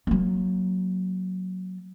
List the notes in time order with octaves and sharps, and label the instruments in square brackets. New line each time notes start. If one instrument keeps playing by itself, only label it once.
[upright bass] F#3 A#3